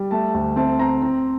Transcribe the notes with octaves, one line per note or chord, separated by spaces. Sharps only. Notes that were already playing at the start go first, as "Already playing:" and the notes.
Already playing: G3
A3 A5
D2
C4 A5
C4 A#5
C4